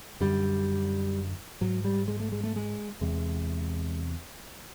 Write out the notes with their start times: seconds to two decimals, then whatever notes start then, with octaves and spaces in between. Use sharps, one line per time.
0.20 F#2 D3 G3
1.61 G#2 F#3
1.84 G3
2.08 G#3
2.20 A3
2.32 G#3
2.43 A3
2.56 G#3
3.01 E2 C3 G#3